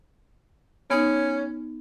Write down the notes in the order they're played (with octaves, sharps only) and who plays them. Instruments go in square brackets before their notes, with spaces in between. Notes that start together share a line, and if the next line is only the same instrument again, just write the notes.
[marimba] B3 D#4 [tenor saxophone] C#4